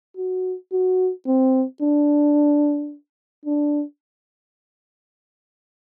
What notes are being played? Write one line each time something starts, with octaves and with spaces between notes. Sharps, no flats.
F#4
F#4
C4
D4
D4